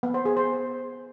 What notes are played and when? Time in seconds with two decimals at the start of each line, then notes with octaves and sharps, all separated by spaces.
0.03 B3
0.14 C5
0.25 G#4
0.37 C5